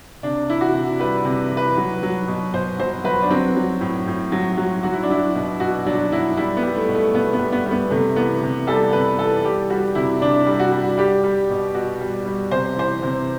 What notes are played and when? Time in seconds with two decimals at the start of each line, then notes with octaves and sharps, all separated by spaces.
0.23 C3 D4
0.49 E3 E4
0.61 F#4
0.74 C3
0.99 G3 B4
1.25 C3
1.51 E3
1.57 B4
1.77 F#3
2.03 F#3
2.28 B2
2.53 B2 C5
2.79 F#3 C5
3.04 F#3 B4
3.22 D4
3.30 F#3 C4
3.56 F#3
3.81 A2
4.07 A2
4.32 F#3
4.57 F#3
4.83 F#3 F#4
4.93 E4
5.03 D4
5.10 F#3 E4
5.35 B2
5.60 B2 F#4
5.86 F#3 D4
6.12 F#3 E4
6.37 G3 E4
6.57 B3
6.63 G3
6.75 A3
6.88 B2
6.95 A3
7.13 B2 B3
7.33 B3
7.39 G3
7.52 B3
7.66 G3
7.71 B3
7.90 C3 A3
8.16 E3 B3
8.43 C3
8.67 G3 A4
8.93 C3 B4
9.19 E3 A4
9.45 G3 G4
9.70 G3 F#4
9.95 C3 E4
10.21 C3 D4
10.46 G3
10.59 F#4
10.72 G3
10.97 G3 G4
11.24 G3
11.50 B2
11.74 B2 F#4
12.01 G3
12.26 G3
12.51 C3 C5
12.77 E3 C5
13.02 C3